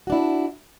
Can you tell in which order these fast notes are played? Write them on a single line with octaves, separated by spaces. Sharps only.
F#4 D4 E4